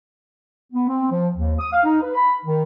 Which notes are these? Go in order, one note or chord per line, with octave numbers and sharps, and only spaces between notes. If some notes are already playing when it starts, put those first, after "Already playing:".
B3
C4
F3
D#2
D#6
F5
D#4
B4
B5
D#3